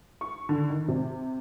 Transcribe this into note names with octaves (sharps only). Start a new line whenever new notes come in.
C#6
D3
D#3
C3